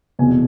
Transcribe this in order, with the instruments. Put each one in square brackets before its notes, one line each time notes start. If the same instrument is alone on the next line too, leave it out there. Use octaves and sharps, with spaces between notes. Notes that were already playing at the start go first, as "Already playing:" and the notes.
[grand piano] F1 E2 B2 G#5